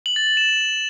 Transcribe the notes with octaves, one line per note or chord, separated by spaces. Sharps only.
F#7
A6
F#7
E7